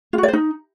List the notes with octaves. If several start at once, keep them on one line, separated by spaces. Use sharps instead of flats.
F4
F#4
D5
C5
D#4